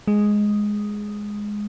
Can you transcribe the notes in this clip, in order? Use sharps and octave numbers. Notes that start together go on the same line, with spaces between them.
G#3